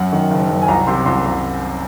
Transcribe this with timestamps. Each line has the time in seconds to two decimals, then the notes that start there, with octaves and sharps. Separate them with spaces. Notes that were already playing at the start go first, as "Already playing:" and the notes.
Already playing: F#2 F#5
0.12 D#3
0.31 F#1
0.50 F#2
0.62 G#5
0.68 C2 A#5
0.87 C3 C6
1.06 C2 C6
1.25 C2